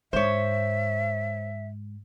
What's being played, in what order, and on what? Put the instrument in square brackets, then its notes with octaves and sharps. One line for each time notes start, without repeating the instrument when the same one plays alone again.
[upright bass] G#2 [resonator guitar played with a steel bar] C5 C#5 [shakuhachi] E5